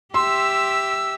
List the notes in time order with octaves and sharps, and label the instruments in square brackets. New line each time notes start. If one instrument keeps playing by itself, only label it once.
[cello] G4 E5 [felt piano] C6 [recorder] E6